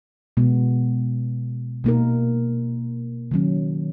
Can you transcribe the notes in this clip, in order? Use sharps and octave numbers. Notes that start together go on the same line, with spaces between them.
B2 G#3 B3
B2 A#3 D#4 A#4
D#3 F#3 C#4